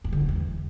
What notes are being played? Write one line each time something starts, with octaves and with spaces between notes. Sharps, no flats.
G2
D3
G#2
E2